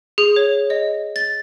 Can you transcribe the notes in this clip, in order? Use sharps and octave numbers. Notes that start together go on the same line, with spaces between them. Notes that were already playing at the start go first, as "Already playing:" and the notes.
G#4
C#5
D#5
A6